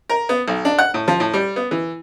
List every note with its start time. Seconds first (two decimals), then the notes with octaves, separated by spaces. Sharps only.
0.10 A#4
0.29 B3
0.48 B1
0.65 D4
0.79 F#5
0.94 A2
1.08 F3
1.20 A2
1.34 G3
1.56 B3
1.71 E3